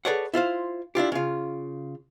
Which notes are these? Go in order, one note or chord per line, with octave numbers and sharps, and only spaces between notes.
G#4 A4 B4 C#5 D5 F#5
E4 F4 C5 F5
D4 E4 F4 G4
C#3 F4